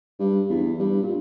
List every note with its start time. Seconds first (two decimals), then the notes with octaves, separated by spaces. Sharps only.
0.19 G2
0.50 E2
0.79 G2
1.03 A#2